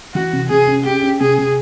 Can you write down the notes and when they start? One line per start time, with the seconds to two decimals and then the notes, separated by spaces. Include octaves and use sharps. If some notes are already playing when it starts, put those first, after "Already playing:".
0.15 E3 F#4
0.33 C3
0.49 C3 G#4
0.67 C#4
0.85 C#4 G4
1.03 C#4
1.20 C3 G#4
1.38 C3